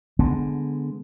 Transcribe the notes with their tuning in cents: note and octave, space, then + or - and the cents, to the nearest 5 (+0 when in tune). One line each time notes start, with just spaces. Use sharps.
D3 +0 G#3 +0 B3 +0